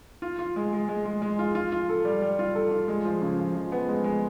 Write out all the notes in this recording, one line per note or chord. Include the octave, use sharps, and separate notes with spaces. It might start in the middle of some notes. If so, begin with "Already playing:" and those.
F4
F4
G#3
G#3
G#3
G#3
G#3
F4
F4
F4
A4
G3
G3
F4
A4
F4
G#3
F3
C#3
F3
F3
B3
G#3
G#3